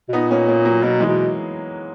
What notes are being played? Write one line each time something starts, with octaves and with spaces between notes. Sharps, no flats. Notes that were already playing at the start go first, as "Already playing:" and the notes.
B2
A#2 B3 D#4
A#3 C#4
A#3 C#4
F#3 A#3
B2 F#3 A#3
E3 G#3
B2